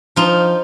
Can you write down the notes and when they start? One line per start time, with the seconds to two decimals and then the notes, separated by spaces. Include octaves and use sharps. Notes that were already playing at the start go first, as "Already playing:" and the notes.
0.16 F3 D#4 F4